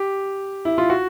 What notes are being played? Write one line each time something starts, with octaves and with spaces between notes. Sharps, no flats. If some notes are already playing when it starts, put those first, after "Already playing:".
Already playing: G4
E4
F4
F#4